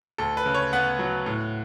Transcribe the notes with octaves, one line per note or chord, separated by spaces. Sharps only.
D2 A4
B4
C#3
C#5
B3 F#5
F#3
A2